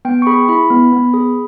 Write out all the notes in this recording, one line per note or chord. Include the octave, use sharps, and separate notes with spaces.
B3 G5
C#6
G#4 B5
E4 B5
B3
B3
G#4